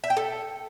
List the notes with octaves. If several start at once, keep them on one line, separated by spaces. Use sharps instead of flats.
E5
G5
A4